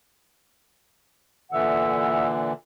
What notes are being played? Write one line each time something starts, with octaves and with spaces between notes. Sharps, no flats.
A#2 D3 E3 E5 F#5 E6